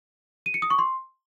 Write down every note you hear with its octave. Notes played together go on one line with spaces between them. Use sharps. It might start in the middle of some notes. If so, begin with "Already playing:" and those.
D#7
C#7
D#6
C#6
C6